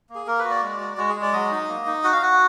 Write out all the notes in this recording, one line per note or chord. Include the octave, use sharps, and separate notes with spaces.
A#3
G#4
A#3 A#4
B4
F#4
D5
G#3
F#4
G#3 F#4
G#4
G#3
D5
F#3 D#5
D#4
A#3
D#4
F#4 F#5
F5
F#4 F#5